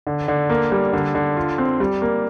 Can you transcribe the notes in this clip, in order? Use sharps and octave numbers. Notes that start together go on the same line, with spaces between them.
D3
D3
A#3
G3
D3
D3
F4
C4
G3
A#3